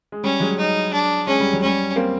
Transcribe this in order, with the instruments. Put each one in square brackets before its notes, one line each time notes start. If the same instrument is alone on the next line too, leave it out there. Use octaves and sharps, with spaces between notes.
[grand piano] G#3
[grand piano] G3 [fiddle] C#4
[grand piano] F#3 G#3
[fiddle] D#4
D4
[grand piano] G#3 [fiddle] C#4
[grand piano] G3
F#3
[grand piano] G3 [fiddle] C#4
[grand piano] A#3 C4